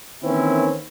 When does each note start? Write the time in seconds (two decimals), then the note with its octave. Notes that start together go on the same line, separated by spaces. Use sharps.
0.23 D#3 E3 A#3 C4 C#4 E4